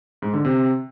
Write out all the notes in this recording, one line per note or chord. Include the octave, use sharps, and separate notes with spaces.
G#2
D3
C3